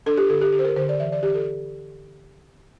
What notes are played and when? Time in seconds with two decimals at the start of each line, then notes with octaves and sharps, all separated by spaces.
0.06 D4 A4
0.18 G4
0.29 D3 A4
0.42 G4
0.53 D3 G4
0.59 C5
0.65 A#4
0.76 D3 C5
0.89 D5
1.00 E3 E5
1.12 D5
1.23 E3 G4
1.35 A4